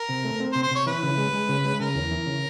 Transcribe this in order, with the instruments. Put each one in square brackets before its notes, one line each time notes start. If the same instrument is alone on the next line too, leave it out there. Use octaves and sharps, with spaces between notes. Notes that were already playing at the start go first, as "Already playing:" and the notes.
Already playing: [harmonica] A#4
[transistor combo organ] C3
A3
C4
[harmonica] C5
[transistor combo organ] C3
[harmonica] C5
[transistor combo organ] C3 [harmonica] C#5
[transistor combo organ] E3 [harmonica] B4
[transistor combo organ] C#3
G#3
G#3
C#3
G#3
[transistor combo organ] C#3 [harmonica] A#4
[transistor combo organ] E2
E3
C#3